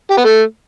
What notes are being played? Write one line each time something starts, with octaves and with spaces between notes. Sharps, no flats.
G4
B3
A3